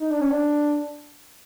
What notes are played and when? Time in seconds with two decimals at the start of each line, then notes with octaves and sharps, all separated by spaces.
0.01 D#4
0.11 D4
0.21 C#4
0.31 D4